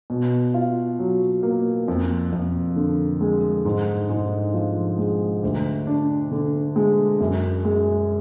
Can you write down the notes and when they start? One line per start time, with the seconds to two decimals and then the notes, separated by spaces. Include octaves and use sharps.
0.10 B2
0.54 F4
0.99 F#3
1.43 A#3
1.88 F2
2.32 F2
2.76 D3
3.21 G#3
3.65 G#2
4.09 G#2
4.54 F3
4.98 G#3
5.43 D2
5.87 D4
6.31 D3
6.76 G#3
7.20 F#2
7.65 G#3